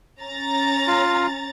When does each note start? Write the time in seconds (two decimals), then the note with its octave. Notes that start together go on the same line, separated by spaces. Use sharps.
0.22 C#4 A#5 A6
0.87 F4